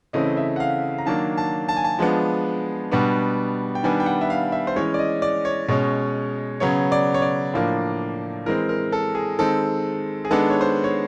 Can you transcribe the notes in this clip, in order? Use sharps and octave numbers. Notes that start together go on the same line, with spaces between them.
C#3 E3 A3 C4 D#5
E5
F#5
F5
A#5
D#3 F#3 A#3 D4 A5
A5
A5
G#5
A5
F3 G#3 B3 D4
B2 G3 B3 D4
G5
D#3 G3 B3 D4 G#5
G5
F#5
E5
F5
E5
C5
E3 G#3 C#4 C#5
D5
D#5
D5
C#5
B2 G#3 C#4
C#3 F#3 B3 C#5
D5
C#5
D5
A2 F3 A#3 D4
E3 G#3 C4 A#4
A#4
A4
G#4
D#3 G#3 C4 A4
G#4
D#3 G#3 B3 D4 A4
C#5
C5
C#5